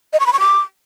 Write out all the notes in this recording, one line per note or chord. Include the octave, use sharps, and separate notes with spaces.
D#5
C#6
B5
C#6
D6